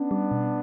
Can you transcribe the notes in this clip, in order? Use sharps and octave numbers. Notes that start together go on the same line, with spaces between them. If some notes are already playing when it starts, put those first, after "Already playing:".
Already playing: B3 C#4 D4
G3
B2